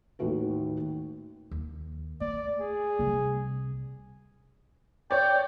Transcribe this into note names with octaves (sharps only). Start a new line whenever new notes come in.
A1 D#2 D#3 A3 F#4 B4
D#2
A3 D5
G#4
C2 C3
C#5 D5 G5